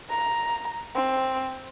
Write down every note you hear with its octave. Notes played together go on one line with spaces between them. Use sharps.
A#5
C4